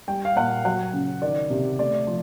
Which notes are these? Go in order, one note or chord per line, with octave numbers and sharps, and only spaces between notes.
G3 G5
F5
A#2 F#5
F#3 F#5
C#3
D#3 D5
C3
A3 D5
F3